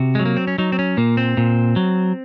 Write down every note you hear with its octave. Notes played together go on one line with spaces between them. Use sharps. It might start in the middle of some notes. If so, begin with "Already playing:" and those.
Already playing: C3 F#4
F#3 G#3
A#3
C4
C#4
F#3 D#4
C4
C#4
A#2 A#3
C4
A#2
F#3